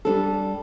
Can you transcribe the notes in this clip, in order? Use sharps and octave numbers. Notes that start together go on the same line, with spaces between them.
G3 D4 A4